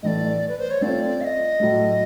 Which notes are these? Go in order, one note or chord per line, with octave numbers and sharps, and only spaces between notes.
A2 E3 A3 D5 D#5
B4
C5
C#5
A3 C4 F4 A4 D5
F5
D#5
A2 F#3 A3